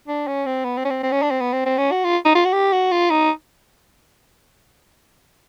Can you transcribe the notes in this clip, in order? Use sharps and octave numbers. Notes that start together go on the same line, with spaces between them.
D4
C#4
C4
B3
C4
C#4
C4
C4
C#4
D4
C4
B3
C4
C4
C#4
F#4
F4
D#4
F4
F#4
G4
F#4
F4
D#4